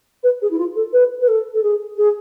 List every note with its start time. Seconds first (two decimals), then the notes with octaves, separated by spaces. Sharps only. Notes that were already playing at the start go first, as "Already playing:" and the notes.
0.23 B4
0.42 G#4
0.51 E4
0.58 F4
0.76 A4
0.93 B4
1.21 B4
1.28 A4
1.54 A4
1.63 G#4
1.98 G#4